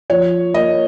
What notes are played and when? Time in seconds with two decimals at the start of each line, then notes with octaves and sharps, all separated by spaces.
0.10 F3 C#5
0.54 A#3 D#5